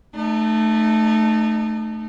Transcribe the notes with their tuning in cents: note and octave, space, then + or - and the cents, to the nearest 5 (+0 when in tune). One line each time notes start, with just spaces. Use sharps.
A3 +0 D#4 -35